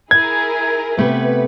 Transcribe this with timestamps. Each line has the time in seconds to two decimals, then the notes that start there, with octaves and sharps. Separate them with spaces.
0.11 E4 G#4 A#4 G#6
0.97 C3 A3 B3 B4